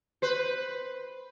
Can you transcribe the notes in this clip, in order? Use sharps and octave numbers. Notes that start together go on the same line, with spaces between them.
B4 C5